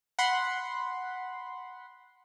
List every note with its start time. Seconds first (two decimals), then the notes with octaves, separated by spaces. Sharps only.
0.19 F#5 B5 C6